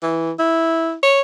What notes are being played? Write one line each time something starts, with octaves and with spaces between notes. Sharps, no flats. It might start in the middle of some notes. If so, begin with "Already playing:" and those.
E3
E4
C#5